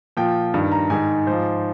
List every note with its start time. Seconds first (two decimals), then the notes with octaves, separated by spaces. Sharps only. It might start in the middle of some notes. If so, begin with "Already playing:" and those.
0.17 A#2 F3 G5
0.54 G2 D#3
0.72 A#5
0.90 G#2 D#3 G#5
1.27 G#2 F3 C5